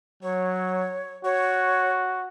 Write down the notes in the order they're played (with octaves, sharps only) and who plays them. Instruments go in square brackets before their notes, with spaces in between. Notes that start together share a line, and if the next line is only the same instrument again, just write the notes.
[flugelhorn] F#3 [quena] C#5
[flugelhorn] F#4 [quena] C#5